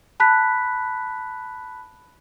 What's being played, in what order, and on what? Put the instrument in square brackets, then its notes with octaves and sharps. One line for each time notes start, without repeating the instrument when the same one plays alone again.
[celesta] A5 B5 F#6 B6